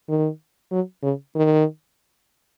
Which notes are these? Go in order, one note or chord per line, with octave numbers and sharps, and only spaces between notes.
D#3
F#3
C#3
D#3